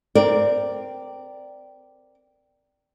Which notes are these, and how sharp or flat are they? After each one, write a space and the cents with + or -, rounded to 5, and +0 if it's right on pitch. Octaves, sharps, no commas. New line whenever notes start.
C4 -10 A#4 +0 D5 +0